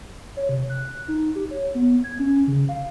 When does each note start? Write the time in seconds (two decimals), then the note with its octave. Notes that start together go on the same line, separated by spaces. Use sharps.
0.37 C#5
0.49 C3
0.70 F#6
1.08 D#4
1.35 G4
1.51 C#5
1.75 B3
2.04 G#6
2.19 C#4
2.47 C#3
2.69 F5